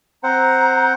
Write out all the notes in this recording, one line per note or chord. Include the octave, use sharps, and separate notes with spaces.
C4 C5 F#5 A#5